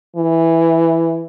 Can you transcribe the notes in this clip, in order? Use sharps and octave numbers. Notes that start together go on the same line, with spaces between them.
E3